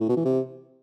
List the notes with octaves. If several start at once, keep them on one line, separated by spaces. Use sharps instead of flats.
A2
B2
E3
C3